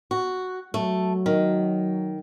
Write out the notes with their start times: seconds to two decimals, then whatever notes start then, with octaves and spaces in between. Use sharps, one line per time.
0.11 F#4
0.74 F#3 A3
1.26 D#3